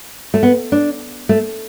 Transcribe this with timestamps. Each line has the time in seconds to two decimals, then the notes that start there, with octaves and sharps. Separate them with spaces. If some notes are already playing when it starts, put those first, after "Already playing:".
0.34 A3
0.43 B3
0.72 D4
1.29 A3